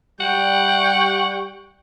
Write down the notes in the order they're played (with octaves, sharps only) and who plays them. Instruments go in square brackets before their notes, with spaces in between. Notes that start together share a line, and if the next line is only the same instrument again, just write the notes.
[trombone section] G3 [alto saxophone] F#5 [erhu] G5 [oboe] C#6